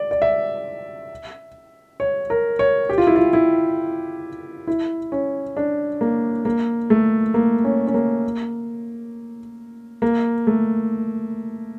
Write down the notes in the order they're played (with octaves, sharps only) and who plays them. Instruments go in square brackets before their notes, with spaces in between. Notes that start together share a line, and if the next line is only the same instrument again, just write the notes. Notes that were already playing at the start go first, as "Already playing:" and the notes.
Already playing: [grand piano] D5
D5
E5
C#5
A#4
C#5
G4
F4
E4
F4
E4
E4
C#4
D4
A#3
A#3
A3
A#3
C#4
C#4
A#3
A#3
A3